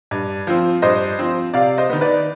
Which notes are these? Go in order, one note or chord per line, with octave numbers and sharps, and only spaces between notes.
G2
F3 C4
G2 C5 D#5
F3 C4
C3 D5 F5
C5 D#5
D#3 B3
B4 D5